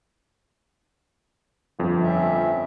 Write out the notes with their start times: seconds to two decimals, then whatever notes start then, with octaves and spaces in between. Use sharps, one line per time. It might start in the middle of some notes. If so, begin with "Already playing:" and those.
1.79 G1 F2
2.02 C4 C#4 E5